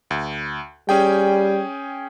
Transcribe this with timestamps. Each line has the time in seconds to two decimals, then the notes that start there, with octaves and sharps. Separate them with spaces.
0.11 D2
0.89 G3 C#4 G#4 G5